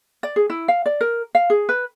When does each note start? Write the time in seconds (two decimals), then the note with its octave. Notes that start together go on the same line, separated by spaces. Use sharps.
0.23 D5
0.36 G#4
0.50 E4
0.68 F5
0.86 D5
1.01 A#4
1.35 F5
1.50 G#4
1.69 B4